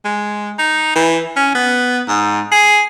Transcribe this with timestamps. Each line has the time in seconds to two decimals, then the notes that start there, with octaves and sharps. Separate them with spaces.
0.05 G#3
0.58 D#4
0.96 E3
1.36 C#4
1.55 B3
2.08 G#2
2.52 G#4